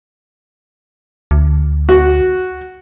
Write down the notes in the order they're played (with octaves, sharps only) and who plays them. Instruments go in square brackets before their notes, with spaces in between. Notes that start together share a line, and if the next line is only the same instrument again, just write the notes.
[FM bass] D2
[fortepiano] F#4